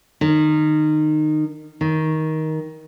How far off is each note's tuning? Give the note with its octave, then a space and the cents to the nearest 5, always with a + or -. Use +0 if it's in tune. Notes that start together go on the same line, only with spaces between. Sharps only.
D#3 -20
D#3 +15